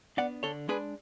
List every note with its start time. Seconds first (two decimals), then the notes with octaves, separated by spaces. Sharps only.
0.17 B3 D4 D5 F#5
0.43 D3 A4 C#5
0.68 G#3 D4 G#4 B4